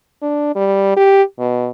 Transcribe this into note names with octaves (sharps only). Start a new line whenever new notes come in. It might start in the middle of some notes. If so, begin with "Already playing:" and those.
D4
G3
G4
B2